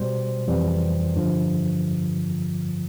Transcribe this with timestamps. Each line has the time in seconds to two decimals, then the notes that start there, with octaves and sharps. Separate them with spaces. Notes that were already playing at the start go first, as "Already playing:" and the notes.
Already playing: B2 G3 C5
0.47 F2 C3 E3 G3
1.16 G2 D3 F3